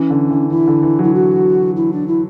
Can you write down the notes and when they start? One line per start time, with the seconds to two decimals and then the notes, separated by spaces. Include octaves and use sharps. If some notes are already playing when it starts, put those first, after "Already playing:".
Already playing: E3 C#4
0.10 D3
0.30 E3
0.51 E3 E4
0.68 D3
0.83 E3
0.99 F#3 E4
1.15 F#4
1.76 E4
1.93 D4
2.08 E4